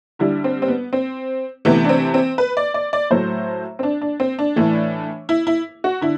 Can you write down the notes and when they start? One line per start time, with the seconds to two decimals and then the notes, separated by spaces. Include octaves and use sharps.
0.19 D3 G3 E4
0.44 C4
0.62 C4
0.68 B3
0.93 C4
1.65 C3 E3 A3 B3
1.84 D4
1.89 C4
2.14 C4
2.38 B4
2.57 D5
2.74 D5
2.93 D5
3.10 A2 F#3 A3 C5
3.79 C4
3.83 D4
4.01 D4
4.20 C4
4.39 D4
4.56 A2 E3 A3
5.29 E4
5.47 E4
5.84 F#4
6.01 D3 E4